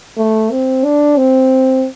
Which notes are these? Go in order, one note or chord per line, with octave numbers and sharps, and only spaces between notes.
A3
C4
D4
C4